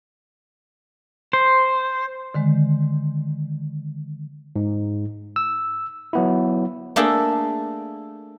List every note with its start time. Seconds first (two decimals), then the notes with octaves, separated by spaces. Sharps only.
1.33 C5
2.34 D3 D#3 G#3
4.56 G#2
5.36 E6
6.13 F#3 B3 E4
6.96 A3 A#3 D4 G#4 A4